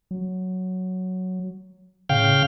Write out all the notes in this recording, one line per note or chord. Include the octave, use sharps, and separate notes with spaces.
F#3
A2 C#3 F5 G5